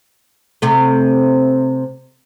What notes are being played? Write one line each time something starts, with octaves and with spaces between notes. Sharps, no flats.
C3 A3